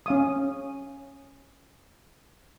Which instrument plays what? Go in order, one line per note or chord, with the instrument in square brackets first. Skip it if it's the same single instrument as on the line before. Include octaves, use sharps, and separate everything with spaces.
[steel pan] C#4 F5 D#6